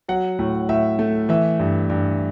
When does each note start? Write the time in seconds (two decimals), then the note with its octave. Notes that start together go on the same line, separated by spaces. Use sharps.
0.08 F#3 F#5
0.39 A2
0.69 A2 E5
0.99 A3
1.29 E3 E5
1.59 G2
1.90 G2